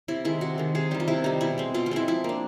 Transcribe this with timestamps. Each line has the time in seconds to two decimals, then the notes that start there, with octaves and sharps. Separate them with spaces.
0.08 C3 E4
0.25 D#3 G#3 E4
0.41 C3 F#4
0.58 D#3 G#3
0.75 C3 G#4
0.91 D#3 G3 G4
1.00 F4
1.08 C3 E4
1.24 D#3 G3 D#4
1.41 B2 E4
1.58 G#3 C4
1.74 B2 F4
1.86 F4
1.91 G#3 C4 E4
2.08 F3 E4
2.24 A#3 D4